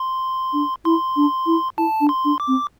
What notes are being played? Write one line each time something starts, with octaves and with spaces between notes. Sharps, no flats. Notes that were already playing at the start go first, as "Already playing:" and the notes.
Already playing: C6
D4
E4 C6
D4
E4
E4 A5
D4
C6
D4
D6
C4